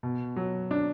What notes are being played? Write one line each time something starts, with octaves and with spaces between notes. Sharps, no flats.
B2
F#3
D4